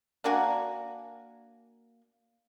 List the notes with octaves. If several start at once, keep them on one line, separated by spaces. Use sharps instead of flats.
A#3 D4 F#4 G#5